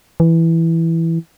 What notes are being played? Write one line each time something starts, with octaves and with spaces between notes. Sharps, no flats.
E3